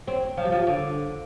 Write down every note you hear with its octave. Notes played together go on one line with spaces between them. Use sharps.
C4
F3
G3
F3
D3